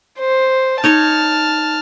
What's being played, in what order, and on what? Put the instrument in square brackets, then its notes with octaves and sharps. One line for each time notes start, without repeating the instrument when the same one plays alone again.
[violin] C5
[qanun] D#4 C#5 D#5 [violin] A5 F6